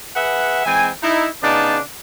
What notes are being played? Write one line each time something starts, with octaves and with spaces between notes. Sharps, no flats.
G#4 B4 E5 F#5
E3 G#3 C4 G#5
D#4 E4
C#3 B3 D4 D#4 D5 A5